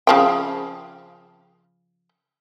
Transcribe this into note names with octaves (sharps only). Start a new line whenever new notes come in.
C#3 F3 G5